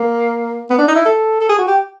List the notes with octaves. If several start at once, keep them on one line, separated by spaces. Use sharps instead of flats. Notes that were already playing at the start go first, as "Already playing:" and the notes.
Already playing: A#3
B3
D4
D#4
E4
A4
A4
G#4
F#4
G4